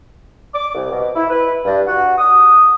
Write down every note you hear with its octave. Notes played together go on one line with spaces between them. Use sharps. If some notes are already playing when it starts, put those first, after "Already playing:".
D6
C2
B2
E4
B4
G2
F#4
D#6